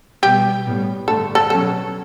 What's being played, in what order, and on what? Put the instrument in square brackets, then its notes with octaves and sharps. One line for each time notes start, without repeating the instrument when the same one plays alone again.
[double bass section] B2 G3 B3 [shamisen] G4
[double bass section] A2 G3 B3
[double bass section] G2 D3 A3 [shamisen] A4
[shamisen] A4
[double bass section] B2 F#3 C#4 [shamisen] A4